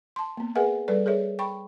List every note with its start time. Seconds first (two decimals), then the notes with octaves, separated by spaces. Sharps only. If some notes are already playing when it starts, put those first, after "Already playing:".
0.16 A5 C6
0.37 A#3 B3
0.55 G#4 A#4 B4 E5 F#5 G#5
0.88 G3 A4 B4 D5
1.06 G#4 A#4 C#5 E5
1.39 G5 B5 C#6